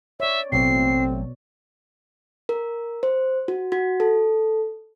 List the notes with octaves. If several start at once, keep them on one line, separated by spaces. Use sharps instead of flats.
C#5 D5 E5
A1 B2 F#3 A3 C4 C7
A#4
C5
F#4
F#4
A4